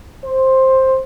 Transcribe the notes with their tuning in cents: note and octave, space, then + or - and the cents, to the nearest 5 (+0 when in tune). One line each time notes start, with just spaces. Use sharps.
C5 +10